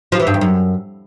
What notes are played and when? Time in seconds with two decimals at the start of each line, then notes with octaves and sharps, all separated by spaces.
0.12 F3
0.19 E3
0.27 G2
0.34 E2
0.41 F#2